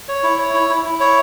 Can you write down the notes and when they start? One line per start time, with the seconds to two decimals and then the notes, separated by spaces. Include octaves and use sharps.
0.08 C#5
0.23 E4
0.39 C#5
0.54 E4
0.69 E4
0.85 E4
1.00 C#5